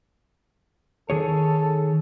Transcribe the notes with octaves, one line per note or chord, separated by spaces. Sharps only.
D#3 G#4 A4 C#5